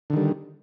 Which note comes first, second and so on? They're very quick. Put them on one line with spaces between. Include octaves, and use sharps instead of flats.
D3 D#3 G3